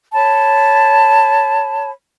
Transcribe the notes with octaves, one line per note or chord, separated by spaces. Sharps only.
C#5 A5 B5